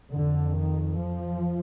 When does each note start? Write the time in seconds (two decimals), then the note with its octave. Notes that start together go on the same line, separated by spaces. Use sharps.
0.13 F2 D3
0.55 D#3
0.96 F3